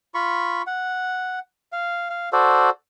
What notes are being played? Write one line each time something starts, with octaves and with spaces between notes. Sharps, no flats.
F4 B5 C#6
F#5
F5
F5
F#4 A4 C5 D5